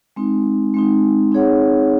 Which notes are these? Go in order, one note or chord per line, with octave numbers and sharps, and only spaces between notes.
G#3 C4 D#4
G#3 C4 D#4
C4 D#4 G#4 C#5 F#5